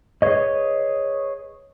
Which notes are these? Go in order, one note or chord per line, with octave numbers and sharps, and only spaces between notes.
G#4 B4 C#5 D#5